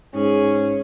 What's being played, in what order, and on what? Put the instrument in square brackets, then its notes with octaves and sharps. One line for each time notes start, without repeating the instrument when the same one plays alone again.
[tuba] G#2 [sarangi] C#4 [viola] G#4